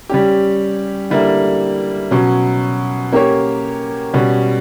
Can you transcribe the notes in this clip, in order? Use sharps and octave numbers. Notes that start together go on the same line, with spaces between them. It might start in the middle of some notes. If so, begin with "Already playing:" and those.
G3 C#4 G4
D3 G3 A#3 E4
B2 F#3 C#4
A#3 C#4 G4 A#4 C#5
B2 G3 C#4